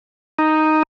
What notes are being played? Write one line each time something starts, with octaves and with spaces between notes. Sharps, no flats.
D#4